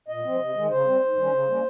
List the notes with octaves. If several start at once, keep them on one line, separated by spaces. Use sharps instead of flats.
A#2 D#5
F3 C4
C3
D#3 G#3
C#3 C5
G3 C4
G#2
D#3 G3 C#4
C#3
G3 A#3 C#4